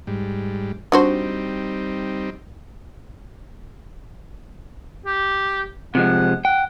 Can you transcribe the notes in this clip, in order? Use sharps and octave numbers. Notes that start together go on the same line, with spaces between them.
G#2 G3
G3 C4 D4 D#4 F#4 C5
G4
C3 F3 G#3 F#5
F#5 G5